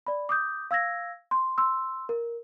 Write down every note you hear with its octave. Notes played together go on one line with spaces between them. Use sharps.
D5 B5
D6 D#6 G6
F5 E6 G#6 A#6
C6
C6 E6
A#4